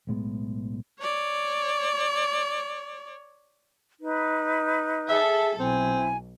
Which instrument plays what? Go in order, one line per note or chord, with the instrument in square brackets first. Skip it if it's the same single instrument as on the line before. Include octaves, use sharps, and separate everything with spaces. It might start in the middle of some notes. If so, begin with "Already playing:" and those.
[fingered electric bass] B1 A2 G#3 B3
[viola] C#5 D5
[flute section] D#4 B4
[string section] G#4 A4 [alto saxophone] E5
[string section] B1 [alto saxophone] C4 [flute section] E4 G#5